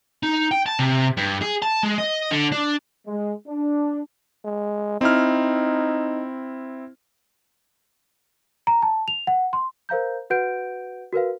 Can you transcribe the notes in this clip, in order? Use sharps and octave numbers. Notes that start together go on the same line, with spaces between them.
D#4
G5
A5
C3
G2
G#4
A5
G#3
D#5
D3
D4
G#3
D4
G#3
C4 D#4 E4 F6
A#5
A5
F7
F#5
C6
A#4 C5 F5 A#5 G6
F#4 B4 F#5 G6 D7
F#4 A#4 B4 F5